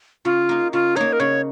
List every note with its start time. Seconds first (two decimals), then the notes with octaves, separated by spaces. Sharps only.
0.25 C#3 F4
0.49 A#3 D#4
0.73 C#3 F4
0.96 A#3 D#4 C#5
1.13 A#4
1.20 C#3 C#5